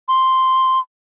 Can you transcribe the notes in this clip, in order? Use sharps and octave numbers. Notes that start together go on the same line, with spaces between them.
C6